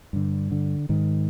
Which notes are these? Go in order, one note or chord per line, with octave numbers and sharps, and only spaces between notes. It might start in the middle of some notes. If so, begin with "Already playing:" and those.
G2 D3
D3
G#2 D#3